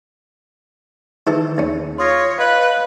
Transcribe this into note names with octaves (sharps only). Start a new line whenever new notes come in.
D#3 E3 G#4 A4
D#2 C#4
F4 C#5 C6 D#6 A#6
B4 D#5 F5 F#6